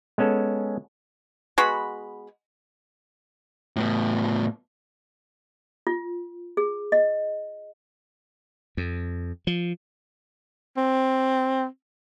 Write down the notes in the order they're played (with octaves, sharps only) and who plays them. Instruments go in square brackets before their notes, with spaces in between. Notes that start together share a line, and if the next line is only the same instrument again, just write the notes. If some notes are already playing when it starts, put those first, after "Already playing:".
[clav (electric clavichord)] G#3 B3 C#4 A4
[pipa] G#3 B3 F#4 B5
[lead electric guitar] A2 B3
[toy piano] F4
G#4
D#5
[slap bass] F2
F3
[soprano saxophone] C4